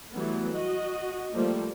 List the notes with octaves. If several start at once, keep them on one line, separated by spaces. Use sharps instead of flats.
E3 F#3 G3 A3 B3
F#4 D#5
F3 G3 A3 A#3